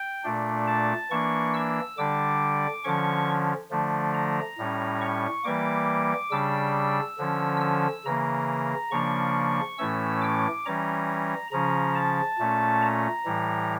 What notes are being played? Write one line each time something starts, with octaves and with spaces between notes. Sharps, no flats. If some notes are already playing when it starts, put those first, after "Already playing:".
Already playing: G5
A#2 A3 D4
A5
E3 A#3 D4 C#6
E6
D3 G3 D4 D6
D3 F3 C#4 C#6
D3 F3 A3 D4
A#5
A2 G3 C#4
C#6
E3 G3 A#3 D6
C#3 G3 D4 E6
D3 F3 C#4
E6
C#3 E3 A#3 A#5
C#3 F3 A#3 D4 C#6
A2 E3 A3 C#4 E6
D6
E3 G3 C#4 A#5
C#3 F3 C#4 A#5
A5
A#2 A3 C#4
A#5
A2 E3 G3